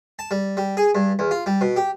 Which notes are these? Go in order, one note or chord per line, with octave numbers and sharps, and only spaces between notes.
A5
G3
G3
G#4
G2
E2
F4
G3
B2
G4